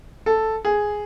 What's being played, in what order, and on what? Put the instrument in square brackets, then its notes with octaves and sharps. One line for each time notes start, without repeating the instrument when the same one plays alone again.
[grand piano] A4
G#4